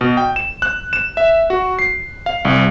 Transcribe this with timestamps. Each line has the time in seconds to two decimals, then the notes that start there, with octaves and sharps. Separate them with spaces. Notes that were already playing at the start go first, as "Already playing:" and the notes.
0.01 B2
0.17 G5
0.36 E7
0.62 F#6
0.93 E7
1.17 E5
1.50 F#4
1.79 C7
2.26 F5
2.45 C2